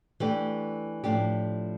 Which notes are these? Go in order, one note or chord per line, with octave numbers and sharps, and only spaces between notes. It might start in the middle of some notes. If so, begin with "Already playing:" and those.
E3 A3 D4 G4
A2 F3 A3 D4 G4